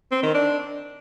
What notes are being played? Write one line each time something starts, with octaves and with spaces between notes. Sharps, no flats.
C4
D#3
D4